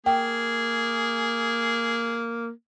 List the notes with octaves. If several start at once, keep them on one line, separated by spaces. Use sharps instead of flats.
A#3 G#4 G5